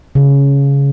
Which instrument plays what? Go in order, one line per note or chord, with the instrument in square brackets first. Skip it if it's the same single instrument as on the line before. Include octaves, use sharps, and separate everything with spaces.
[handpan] C#3